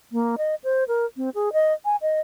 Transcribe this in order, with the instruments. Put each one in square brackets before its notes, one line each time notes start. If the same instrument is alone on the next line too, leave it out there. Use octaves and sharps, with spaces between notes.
[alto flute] A#3
D#5
C5
A#4
C4
G#4
D#5
G#5
D#5